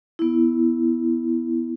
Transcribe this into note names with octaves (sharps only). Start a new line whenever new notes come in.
B3 E4